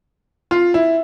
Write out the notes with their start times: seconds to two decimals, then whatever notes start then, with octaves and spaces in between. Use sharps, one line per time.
0.51 F4
0.74 E4